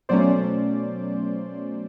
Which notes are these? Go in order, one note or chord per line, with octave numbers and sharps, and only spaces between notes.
B2 F#3 A3 C#4 C5 D5